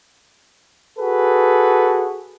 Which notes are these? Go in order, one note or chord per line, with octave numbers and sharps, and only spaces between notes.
F#4 G#4 A4 B4